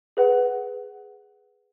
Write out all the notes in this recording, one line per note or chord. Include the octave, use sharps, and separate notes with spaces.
G#4 B4 F#5